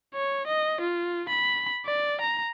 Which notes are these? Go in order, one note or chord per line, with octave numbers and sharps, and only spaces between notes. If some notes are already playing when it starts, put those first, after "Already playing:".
C#5
D#5
F4
B5
D5
A#5